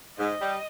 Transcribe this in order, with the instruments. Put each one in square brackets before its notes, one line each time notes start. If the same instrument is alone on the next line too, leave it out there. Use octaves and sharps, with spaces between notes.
[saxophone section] G#2 [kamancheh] D#5
[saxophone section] G3